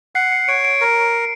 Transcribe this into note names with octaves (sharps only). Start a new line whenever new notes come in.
F#5 C7
C#7
C#5 D7
D7
A#4 D7